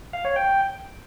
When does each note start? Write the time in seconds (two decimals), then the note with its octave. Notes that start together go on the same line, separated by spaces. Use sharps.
0.13 F5
0.25 C#5
0.36 G5